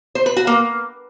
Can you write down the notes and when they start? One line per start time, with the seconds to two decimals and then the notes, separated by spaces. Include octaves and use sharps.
0.15 C5
0.26 B4
0.37 F#4
0.47 A#3